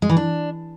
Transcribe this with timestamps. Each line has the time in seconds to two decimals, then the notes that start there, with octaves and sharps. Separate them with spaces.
0.02 G#3
0.09 E3
0.17 D4